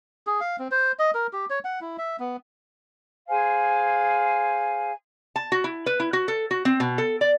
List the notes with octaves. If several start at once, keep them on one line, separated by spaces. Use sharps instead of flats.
G#4
F5
C4
C5
D#5
A#4
G4
C#5
F#5
E4
E5
B3
G#4 C5 F5 G#5
A5
F#4
E4
B4
E4
F#4
A4
F#4
C4
B2
A4
D5